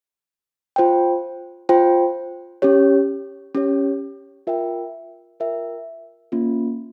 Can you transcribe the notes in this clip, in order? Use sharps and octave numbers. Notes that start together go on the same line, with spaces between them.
F4 C5 G5
F4 C5 G5
C#4 G4 C#5
C#4 G4 C#5
F4 A#4 E5 G5
F4 A#4 E5 G5
A#3 C#4 F4